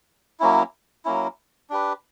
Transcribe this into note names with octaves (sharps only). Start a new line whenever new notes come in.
F#3 A#3 C#4 E4
F#3 A#3 C#4 E4
D4 G4 B4